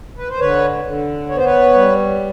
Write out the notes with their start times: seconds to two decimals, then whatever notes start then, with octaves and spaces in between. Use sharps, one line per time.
0.17 B4
0.29 C5
0.39 D3 B4 C#5
0.85 D3
1.29 B3 C#5
1.37 C5
1.45 B4 C#5
1.74 G3